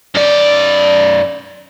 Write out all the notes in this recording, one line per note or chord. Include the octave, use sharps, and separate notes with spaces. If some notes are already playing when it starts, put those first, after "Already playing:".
F#2 D5